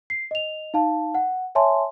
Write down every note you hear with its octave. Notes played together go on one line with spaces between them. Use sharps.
C7
D#5 F7
D#4 F5 A5
F#5
C#5 E5 G#5 A5 C6